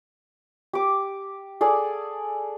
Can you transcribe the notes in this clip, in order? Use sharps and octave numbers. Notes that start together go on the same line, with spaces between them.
G4 D6
G#4 A4 D5 F#5